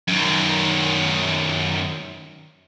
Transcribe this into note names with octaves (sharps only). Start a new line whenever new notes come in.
F#2 D#3